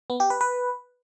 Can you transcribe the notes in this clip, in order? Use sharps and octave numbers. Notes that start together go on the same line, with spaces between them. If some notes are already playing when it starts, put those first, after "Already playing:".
B3
G4
B4
B4